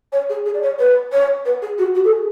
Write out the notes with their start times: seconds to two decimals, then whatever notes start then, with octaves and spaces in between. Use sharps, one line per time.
0.12 C#5
0.30 G#4
0.46 G#4
0.54 D5
0.62 C#5
0.79 B4
1.12 C#5
1.45 B4
1.62 G#4
1.78 F#4
1.95 F#4
2.04 A4
2.12 G#4